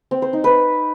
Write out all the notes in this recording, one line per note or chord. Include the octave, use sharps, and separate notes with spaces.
C4
C5
D#4
B4